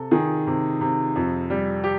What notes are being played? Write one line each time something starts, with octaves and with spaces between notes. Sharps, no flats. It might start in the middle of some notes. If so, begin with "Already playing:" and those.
Already playing: C3 A4
D#3 G#4
C3
C3
F2
G3
G4